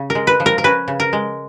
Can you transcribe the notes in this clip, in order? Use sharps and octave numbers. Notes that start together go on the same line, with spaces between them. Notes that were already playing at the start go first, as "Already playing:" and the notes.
Already playing: C#3
A#4
G#3
B4
F3
A#4
A#4
C#4 B4
C#3
A#4
G#3